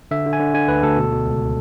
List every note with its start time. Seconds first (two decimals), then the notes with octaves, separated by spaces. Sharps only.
0.11 D3 E5
0.26 D3
0.33 G#5
0.40 D3
0.54 D3 G#5
0.68 D2 B4
0.83 D2 A4
0.97 B2
1.12 B2
1.26 C#2